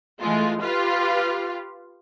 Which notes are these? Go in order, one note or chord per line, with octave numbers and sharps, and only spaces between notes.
E3 G#3 A3 F4
F4 G4 B4 F5